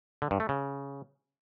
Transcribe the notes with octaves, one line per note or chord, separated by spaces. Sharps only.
D3
G2
A3
C#3